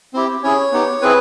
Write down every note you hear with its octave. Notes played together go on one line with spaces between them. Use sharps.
C4 E4 G4
C#4 E4 G#4 C#5
B3 D#4 G4
C4 E4 G#4 B4